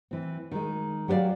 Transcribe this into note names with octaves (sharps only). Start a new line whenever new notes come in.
E3 C4
D#3 G#3
F#3 G4 A#4 D5 F5